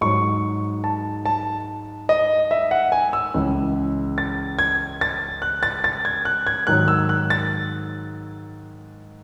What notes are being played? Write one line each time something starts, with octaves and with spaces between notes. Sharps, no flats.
G#2 F#3 C#6
A5
A5
D#5
E5
F#5
G#5
E6
C#2 C#3 E3
A6
G#6
A6
F#6
A6
A6
G#6
F#6
G#6
G#2 D#3 F#3 F#6
E6
F#6
A6